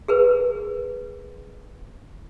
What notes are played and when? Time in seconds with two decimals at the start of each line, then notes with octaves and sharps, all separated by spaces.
0.08 G#4 A#4 B4